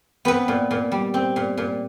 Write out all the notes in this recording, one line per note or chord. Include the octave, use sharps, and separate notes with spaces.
B3 C4 B4
A#2
A#2
G3
C4
A#2
A#2